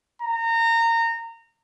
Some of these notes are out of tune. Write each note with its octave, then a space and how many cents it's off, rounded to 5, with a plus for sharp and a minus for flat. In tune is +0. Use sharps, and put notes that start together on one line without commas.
A#5 -25